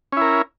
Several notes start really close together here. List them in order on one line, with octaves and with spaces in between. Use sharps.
C#4 E4 A#4